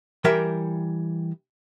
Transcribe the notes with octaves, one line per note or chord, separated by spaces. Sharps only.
E3 G3 A#4 E5 G5 C6